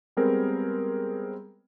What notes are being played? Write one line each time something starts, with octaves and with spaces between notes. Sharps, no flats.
G3 G#3 B3 C4 G#4 A#4